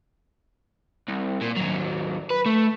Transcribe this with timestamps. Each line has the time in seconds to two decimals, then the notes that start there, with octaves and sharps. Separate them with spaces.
1.08 C2
1.41 A#2
1.56 D#2 F#3
2.30 B4
2.46 A3